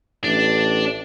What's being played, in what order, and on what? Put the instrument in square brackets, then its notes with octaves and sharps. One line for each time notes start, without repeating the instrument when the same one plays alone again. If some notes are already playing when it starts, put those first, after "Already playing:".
[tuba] A1 [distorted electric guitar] D4